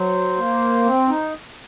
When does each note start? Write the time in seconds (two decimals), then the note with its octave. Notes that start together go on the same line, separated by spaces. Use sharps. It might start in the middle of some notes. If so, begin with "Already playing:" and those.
Already playing: F#3 C5
0.38 A#3
0.85 C4
1.09 D#4